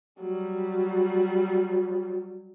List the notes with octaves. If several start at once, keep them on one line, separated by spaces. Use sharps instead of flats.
F#3 G3